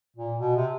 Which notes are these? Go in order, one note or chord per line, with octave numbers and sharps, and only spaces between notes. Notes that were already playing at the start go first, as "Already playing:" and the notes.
A#2
B2
C3